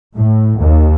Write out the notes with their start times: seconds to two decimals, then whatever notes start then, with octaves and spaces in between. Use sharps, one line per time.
0.15 A2
0.59 D#2